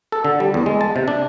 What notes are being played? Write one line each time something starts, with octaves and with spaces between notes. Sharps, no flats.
A4
D3
G3
E2
G#3
A5
C3
D4